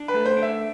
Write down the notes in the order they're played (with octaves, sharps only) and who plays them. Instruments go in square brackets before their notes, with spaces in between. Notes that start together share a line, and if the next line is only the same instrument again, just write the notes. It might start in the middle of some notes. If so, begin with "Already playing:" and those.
Already playing: [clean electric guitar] D4
[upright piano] B4
[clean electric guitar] A3
[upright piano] C5
[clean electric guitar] D4
[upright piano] E5